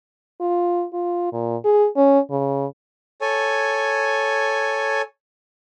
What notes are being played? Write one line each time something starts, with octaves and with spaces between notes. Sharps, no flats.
F4
F4
A#2
G#4
C#4
C#3
A4 C#5 G#5